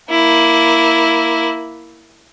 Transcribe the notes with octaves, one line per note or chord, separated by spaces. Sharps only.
A#3 E4